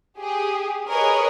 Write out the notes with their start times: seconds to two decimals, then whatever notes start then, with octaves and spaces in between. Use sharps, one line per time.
0.19 G4 G#4
0.87 G#4 A#4 B4 C#5 D#5